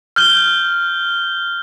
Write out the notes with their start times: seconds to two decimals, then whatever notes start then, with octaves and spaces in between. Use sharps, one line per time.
0.16 F6 G6 G7